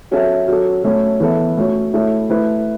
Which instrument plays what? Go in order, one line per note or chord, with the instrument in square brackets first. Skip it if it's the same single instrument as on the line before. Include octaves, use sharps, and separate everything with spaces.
[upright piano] F#3 C#4 A4 E5
F#3 C#4 A4
F#3 A3 C#4
E3 B3 A4 E5
A3 C#4 F#4 C#5
A3 E4 A4 C#5 E5
A3 E4 B4